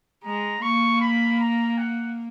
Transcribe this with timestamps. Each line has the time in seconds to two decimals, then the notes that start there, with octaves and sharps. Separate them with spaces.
0.24 G#3 A#5
0.62 A#3 C#6
1.01 B5
1.40 A#5
1.78 F#5